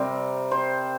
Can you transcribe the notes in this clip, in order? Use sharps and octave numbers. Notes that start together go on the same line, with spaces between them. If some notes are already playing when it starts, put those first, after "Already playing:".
Already playing: C3 G3 C4 A#4
C5